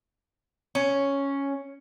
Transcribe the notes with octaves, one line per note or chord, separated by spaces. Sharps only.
C#4